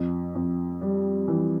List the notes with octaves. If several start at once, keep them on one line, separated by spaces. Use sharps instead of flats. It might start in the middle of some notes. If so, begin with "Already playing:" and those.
Already playing: F2
F2
G3
E3